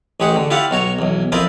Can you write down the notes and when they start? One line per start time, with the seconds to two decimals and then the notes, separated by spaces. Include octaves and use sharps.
0.20 A1 G#3 G4 G#4 F#5
0.36 D3
0.50 E4 F4 G4 D5 F5 F#5
0.71 B1 F#4 C#5 A#5
0.99 B1 E2
1.32 F2 E4 A#4 C5 D5 D#6